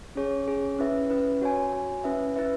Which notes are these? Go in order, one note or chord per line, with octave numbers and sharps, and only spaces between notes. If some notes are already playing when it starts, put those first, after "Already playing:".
C#4 G#4 C#5
C#4 G#4 C#5
C#4 E4 B4 E5
C#4 E4 B4 E5
F#4 C#5 G#5
F#4 C#5 G#5
C#4 E4 B4 E5
C#4 E4 B4 E5